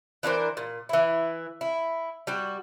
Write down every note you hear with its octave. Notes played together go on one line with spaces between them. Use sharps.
E3 D4 A#4 C5
A#2
E3 E4
E4
G3 F#4